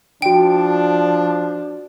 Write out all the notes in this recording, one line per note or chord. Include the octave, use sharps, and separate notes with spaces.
F3 D4 F#4 G5 D7